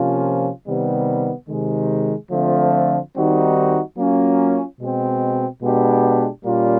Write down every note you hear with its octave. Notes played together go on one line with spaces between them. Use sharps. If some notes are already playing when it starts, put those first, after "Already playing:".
Already playing: C3 F3 A#3 C#4 F4
C3 D#3 G3 B3
C3 D#3 G#3
D3 F3 A3 C4 F4
D#3 G3 C4 D#4 F#4
F#3 A#3 C#4 F4
B2 G#3 C4
B2 G#3 B3 D4 G4
A#2 G3 A#3 C#4 F4